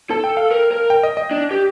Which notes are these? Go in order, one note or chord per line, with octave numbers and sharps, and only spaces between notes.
A4 A5
G5
F5
A#4
A#4
G5
D#5
D#5
D4
G4